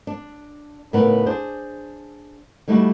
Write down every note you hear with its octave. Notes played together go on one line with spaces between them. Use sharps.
D4
A2 C#3 B3 D#4 A#4 B4
D4 G#4 C5
D3 G3 A3 D#4 E4 F#4